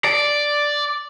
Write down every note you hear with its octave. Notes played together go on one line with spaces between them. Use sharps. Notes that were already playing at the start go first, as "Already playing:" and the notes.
D5